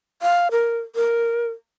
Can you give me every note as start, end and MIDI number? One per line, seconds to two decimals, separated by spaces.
0.22 0.48 77
0.51 0.78 70
0.96 1.47 70